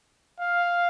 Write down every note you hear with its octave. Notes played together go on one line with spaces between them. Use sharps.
F5